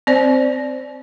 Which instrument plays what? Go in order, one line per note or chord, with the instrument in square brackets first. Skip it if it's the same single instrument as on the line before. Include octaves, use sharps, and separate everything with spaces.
[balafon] C4 C5 D5